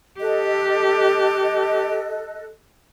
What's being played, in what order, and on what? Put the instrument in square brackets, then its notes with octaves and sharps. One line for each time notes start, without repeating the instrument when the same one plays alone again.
[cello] G4 [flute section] A4 D#5 F#6